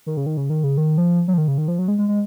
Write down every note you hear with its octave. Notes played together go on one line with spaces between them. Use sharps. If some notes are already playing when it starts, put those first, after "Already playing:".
D#3
C#3
D#3
C#3
D#3
C#3
D#3
F3
F#3
F3
D#3
C#3
D#3
F3
F#3
G#3
G#3
G#3